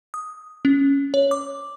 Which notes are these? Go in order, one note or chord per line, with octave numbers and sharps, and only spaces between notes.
D#6
C#4
C#5
D6